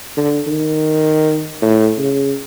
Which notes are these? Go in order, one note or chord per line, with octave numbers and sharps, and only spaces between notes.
D3
D#3
A2
C#3